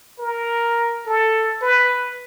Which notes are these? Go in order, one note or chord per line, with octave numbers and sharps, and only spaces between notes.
A#4
A4
B4